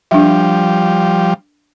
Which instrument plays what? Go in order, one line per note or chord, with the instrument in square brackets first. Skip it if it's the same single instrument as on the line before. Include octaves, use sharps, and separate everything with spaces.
[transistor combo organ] F3 G3 [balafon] D4 E5